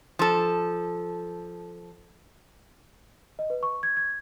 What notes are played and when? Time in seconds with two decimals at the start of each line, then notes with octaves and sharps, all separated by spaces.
0.19 F3 A4
3.39 D#5
3.50 B4
3.63 C#6
3.83 G#6
3.97 G#6